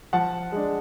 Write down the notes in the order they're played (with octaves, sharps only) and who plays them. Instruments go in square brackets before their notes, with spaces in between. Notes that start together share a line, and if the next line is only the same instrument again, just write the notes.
[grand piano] F3 F#5 A5
G#3 D4